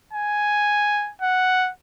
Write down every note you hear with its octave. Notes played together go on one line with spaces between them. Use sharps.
G#5
F#5